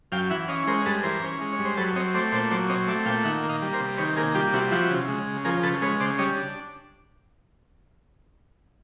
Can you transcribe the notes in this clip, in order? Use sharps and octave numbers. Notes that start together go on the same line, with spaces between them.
F#2 F5 G5
E3 E5 F#5
C#4 D#5 F5
G#3 A#4 C5
G2 A4 B4
E3 A#4 C5
C#4
G#3
C#5
G2
C5
F#3 A4 B4
C4 C#5 D#5
A3 C5 D5
A#2 C5 D5
F#3 C5 D5
C4 C#5 D#5
A3 D5 E5
A#2 F5 G5
D#3 E5 F#5
A#3
D#5 F5
G3
A#4 C5
C3
D#3 B4 C#5
A#3 G#4 A#4
G3 F4 G4
C3 E4 F#4
F3 E4 F#4
C#3
G#3
C#3
F3 G#4 A#4
C#3 A4 B4
G#3 B4 C#5
C#3 C5 D5
G3 C#5 D#5
D4